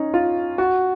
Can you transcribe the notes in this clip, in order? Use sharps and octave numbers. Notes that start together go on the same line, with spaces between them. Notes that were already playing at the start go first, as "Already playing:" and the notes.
Already playing: C#4 D#4
F4
F#4